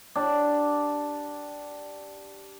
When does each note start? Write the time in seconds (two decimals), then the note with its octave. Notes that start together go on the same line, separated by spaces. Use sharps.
0.15 D4 G4 D5